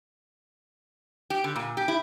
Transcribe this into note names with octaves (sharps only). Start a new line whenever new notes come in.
G4
D3
A#2
G4
E4